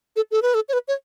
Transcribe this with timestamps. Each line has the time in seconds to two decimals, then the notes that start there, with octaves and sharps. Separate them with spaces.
0.16 A4
0.31 A4
0.42 B4
0.54 A4
0.69 C#5
0.73 B4
0.88 C#5